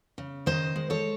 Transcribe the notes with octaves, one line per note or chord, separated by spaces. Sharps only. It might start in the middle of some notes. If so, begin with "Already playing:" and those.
C#3
D#3 C5 D#5
G#3
A4 C#5